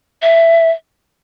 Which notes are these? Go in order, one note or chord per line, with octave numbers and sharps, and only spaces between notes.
E5